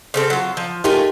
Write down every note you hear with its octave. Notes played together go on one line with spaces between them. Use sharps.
C#3 C4 A4
F#3 F4
F3
A3 D#4 F4 G4 A#4 G#5